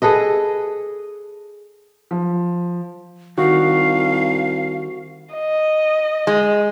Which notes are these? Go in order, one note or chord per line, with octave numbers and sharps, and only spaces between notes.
G#4 A4 B4 D#5
F3
C2 D#3 F#4 F5
D#5
G#3